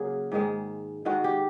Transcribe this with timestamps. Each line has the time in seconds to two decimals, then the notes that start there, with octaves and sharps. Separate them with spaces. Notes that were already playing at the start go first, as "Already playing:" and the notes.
Already playing: C#3 F#3 A#3 G#4
0.32 G#2 D#3 G#3
1.05 G#2 D#3 G#3 F#4
1.24 G4